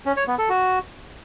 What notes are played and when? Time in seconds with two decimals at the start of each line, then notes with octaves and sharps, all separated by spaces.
0.06 C#4
0.17 C#5
0.28 B3
0.38 A4
0.49 F#4